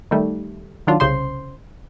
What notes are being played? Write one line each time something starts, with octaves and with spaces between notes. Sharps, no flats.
D#3 G3 A3
D#3 F#3 D4 F4
C2 C#3 C5 C6